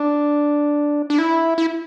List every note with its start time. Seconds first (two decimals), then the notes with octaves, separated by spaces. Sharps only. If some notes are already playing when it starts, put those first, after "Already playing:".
Already playing: D4
1.10 D4
1.18 E4
1.58 E4